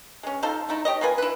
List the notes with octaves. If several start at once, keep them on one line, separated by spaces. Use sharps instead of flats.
G#3 C#4
D#4 F4 A4 C5
A3 D#4 E4
G4 C#5 D#5
A#3 F4 B4 G#5
E4 B4